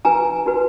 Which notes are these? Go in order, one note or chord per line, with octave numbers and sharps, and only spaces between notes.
D#4 F#4 B4 G#5 A#5
D#4 F#4 B4